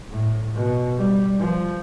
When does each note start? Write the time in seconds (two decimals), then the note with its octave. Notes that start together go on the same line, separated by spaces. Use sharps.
0.11 A2
0.55 B2
0.98 G3
1.40 F3